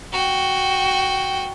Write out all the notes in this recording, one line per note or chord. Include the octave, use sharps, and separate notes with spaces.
F#4 G5